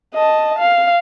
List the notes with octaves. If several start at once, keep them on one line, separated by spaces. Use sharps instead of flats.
D#5 A5
F5